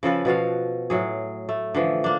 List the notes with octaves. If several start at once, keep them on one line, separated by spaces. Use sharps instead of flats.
C#3 F3 A4 B4
B2 F3 F#4 F5
A2 F#3 G#4
A3
D3 E3 F3
A#3 D4